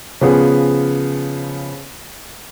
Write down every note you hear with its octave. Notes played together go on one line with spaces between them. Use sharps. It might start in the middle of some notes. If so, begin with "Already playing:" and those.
C#3 F3 B3 G#4